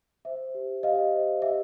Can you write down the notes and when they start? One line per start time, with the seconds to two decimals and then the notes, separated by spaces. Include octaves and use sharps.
0.25 C5 E5
0.55 G4
0.83 G4 D#5 F5
1.13 C5
1.42 G4 E5